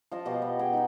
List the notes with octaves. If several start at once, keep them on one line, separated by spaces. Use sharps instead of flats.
F3 D#5 A5
B2 G4 D#5 F#5
B3
G#4 G5
D#4 F4 G#5